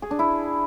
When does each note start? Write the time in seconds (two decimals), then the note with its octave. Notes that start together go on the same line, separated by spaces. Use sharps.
0.02 G#4
0.11 D4
0.19 E4